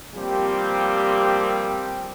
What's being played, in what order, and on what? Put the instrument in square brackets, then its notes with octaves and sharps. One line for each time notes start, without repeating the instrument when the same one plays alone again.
[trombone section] F3 G3 A#3 C4 G4